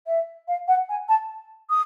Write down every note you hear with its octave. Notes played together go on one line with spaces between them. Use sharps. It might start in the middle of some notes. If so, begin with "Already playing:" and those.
E5
F5
F#5
G#5
A5
D#6